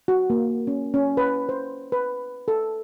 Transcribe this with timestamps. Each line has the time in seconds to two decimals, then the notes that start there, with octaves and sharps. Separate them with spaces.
0.08 F#4
0.30 A#3
0.67 C#4
0.94 C#4
1.17 B4
1.49 C5
1.92 B4
2.48 A4